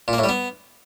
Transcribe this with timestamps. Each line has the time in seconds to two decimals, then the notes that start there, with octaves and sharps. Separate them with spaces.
0.08 A#2
0.13 A#3
0.18 A2
0.24 G3
0.29 B3